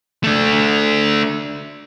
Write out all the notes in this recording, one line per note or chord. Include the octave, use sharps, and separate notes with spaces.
A3 D4